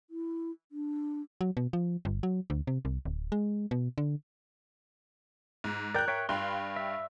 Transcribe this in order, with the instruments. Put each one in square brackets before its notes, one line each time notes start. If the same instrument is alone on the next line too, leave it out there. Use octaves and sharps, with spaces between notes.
[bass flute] E4
D4
[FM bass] F#3
B2
F3
G1
F#3
D2
C3
C2
D1
G#3
B2
D3
[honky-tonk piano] G#2
[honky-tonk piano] A#4 F#6 [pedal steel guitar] D5 G5
[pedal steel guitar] C#5 E5 G5
[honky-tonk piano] G2 G5 [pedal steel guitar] F5 B5 C6
[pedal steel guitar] E5